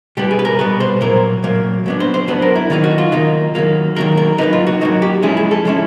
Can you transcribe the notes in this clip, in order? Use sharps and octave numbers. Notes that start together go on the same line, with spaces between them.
B2 G3 B3 G4
G#4
B4
A#4
B2 G3 B3 B4
C5
A#2 F#3 A#3 A#4
A#2 F#3 A#3
F#3 B3 D4
C5
C5
F#3 B3 D4 B4
A#4
E4
D#3 F#3 A#3 D#4 F4
F#4
F4
D#3 F#3 A#3 D#4
D#3 F#3 A#3
D#3 F#3 A#3 A#4
A#4
F#3 A#3 D#4 B4
F4
F#4
F#3 A#3 D#4 F#4
G4
F3 G#3 C#4 E4 G#4
G#4
A4
F3 G#3 C#4 E4